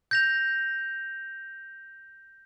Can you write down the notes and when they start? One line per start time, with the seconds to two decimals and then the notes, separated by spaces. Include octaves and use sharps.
0.11 G6 A#6 F7